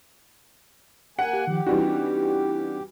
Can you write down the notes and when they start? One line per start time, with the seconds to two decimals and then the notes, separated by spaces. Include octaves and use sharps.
1.19 A#3 F#5 G#5
1.33 G4
1.47 D#3 F3 G4
1.67 E3 G3 C4 D4 D#4 F#4